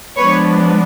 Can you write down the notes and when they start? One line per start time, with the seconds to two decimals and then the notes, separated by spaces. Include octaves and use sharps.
0.17 F3 G#3 B3 D4 B4 C#5